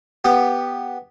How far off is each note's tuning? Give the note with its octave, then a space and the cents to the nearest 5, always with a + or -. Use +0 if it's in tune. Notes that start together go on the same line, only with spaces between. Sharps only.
B3 +0 G4 +0 D#6 -45